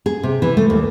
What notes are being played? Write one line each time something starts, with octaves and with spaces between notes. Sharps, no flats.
G#4
C3
E3
A3
D#2